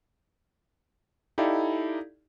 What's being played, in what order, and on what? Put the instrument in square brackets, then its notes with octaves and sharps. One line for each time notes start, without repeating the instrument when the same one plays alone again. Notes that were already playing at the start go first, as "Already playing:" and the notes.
[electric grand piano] D#4 E4 G4 A4 D5 F5